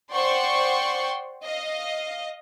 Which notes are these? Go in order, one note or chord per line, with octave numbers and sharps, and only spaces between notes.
C5 D5 F#5 G5 C6 C#6
D#5 F5